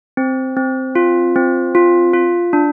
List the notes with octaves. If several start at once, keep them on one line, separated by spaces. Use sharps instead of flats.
C4
C4
F4
C4
F4
F4
D4